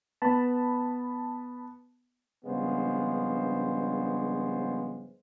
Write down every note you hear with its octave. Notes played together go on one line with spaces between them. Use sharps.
B3 A5 B5
A#1 G2 C#3 G#3 B3 C5